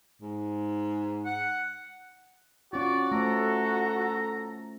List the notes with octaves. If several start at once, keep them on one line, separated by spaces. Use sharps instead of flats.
G#2
F#5
C#4 F4 F#4 D5 C#6
A3 A4 C5 A#5